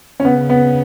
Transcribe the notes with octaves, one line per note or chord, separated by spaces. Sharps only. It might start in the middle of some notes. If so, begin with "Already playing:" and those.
C#4
C#3 B3
B3